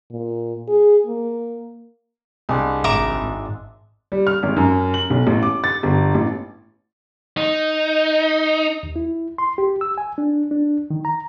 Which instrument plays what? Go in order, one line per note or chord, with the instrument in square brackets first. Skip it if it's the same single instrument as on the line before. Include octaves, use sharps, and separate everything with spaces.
[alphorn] A#2
G#4
A#3
[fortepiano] C2 [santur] G#3 D4
[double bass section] G#1 [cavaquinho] E5 A#5 D6
[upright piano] G3
F6
G#1
F#2
F#7
B1
A1
D6
A6
G1
A1
[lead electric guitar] D#4
[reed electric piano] D#2
E4
C6
G4
E6
G#5
D4
D4
D#3
A#5